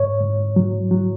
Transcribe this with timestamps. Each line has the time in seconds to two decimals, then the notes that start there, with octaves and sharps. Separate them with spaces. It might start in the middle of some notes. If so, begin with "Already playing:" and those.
Already playing: G#2 C#5
0.21 G#2
0.56 F#3
0.91 F#3